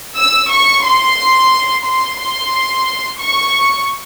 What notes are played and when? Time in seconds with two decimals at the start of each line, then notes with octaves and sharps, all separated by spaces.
0.18 E6
0.51 C#6
0.85 C6
1.86 C6
2.19 C6
3.20 C#6